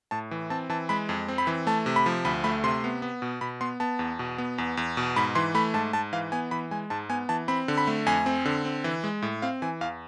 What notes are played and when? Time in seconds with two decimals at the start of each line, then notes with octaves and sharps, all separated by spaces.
0.11 A2 A5
0.31 E3
0.50 C4 A5
0.69 E3 A5
0.89 G#3 B5
1.09 F2
1.28 C4
1.38 B5
1.47 E3
1.67 A3 A5
1.86 C3
1.96 B5
2.06 F3
2.25 D2 B5
2.44 A3 B5
2.64 C3 C6
2.84 B3
3.02 B3
3.22 B2
3.41 B2 B5
3.61 B3 C6
3.80 B3 A5
3.99 E2
4.19 B2
4.38 B3
4.58 E2
4.77 E2
4.97 B2
5.16 G#2 B5
5.35 E3 C6
5.55 A3 B5
5.74 G#2 A5
5.93 G#2 A5
6.13 E3 F5
6.32 B3 G#5
6.51 E3 B5
6.71 G#3 G#5
6.90 G#2 A5
7.09 B3 G#5
7.29 E3 A5
7.48 C4 B5
7.68 D3
7.78 B5
7.87 A3
8.06 F2 G#5
8.26 C4
8.45 D3
8.65 C4
8.84 E3
9.04 G#3
9.22 A2
9.42 C4 F5
9.62 E3 G#5
9.81 E2 F5